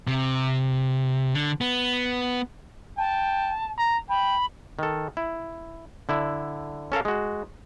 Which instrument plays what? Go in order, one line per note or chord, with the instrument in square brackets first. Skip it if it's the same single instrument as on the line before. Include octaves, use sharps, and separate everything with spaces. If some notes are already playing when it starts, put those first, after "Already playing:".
[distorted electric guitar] C3
D3
B3
[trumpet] G5 [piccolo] A5
[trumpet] A#5
[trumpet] G5 [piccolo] B5
[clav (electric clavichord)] D#3 A4
E4
D3 E4
C#4 A4 A#4 F5
G#3 F#4